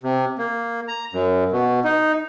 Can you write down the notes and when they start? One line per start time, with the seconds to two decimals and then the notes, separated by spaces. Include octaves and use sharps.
0.03 C3
0.38 A#3
0.88 A#5
1.13 F#2
1.52 B2
1.84 D#4